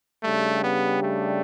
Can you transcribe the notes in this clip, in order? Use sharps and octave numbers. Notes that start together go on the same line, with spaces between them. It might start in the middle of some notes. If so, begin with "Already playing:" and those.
C#3 G3 A3 D4 G4
B3
A3